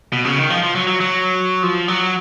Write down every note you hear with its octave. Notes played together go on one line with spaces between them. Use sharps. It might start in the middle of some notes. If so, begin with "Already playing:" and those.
B2
C#3
D#3
F3
F3
F#3
F#3
F#3
F3
F#3